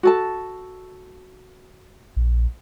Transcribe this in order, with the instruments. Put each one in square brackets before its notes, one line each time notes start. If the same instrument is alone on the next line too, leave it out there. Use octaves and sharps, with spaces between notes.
[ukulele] F#4 A4 A5
[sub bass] A#1